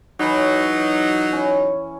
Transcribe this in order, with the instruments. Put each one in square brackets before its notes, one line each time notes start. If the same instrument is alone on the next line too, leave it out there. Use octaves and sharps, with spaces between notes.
[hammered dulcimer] E3 C#5 B5 [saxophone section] F#3 D#4
[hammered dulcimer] C#4 E4 C#5